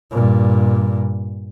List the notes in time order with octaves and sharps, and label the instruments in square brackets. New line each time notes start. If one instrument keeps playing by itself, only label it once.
[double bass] G2 A#2